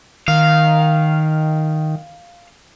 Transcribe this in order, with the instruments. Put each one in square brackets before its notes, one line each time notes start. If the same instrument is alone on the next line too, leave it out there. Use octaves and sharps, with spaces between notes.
[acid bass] D#3 [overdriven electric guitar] F5